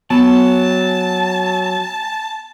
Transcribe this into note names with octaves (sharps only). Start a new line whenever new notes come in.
F#3 B3 A5